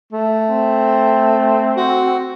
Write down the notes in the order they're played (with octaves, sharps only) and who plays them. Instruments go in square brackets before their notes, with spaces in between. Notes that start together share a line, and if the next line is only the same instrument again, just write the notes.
[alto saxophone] A3
[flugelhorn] C4
[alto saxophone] F#4